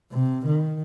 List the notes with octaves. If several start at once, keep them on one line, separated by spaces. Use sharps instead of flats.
C3
D#3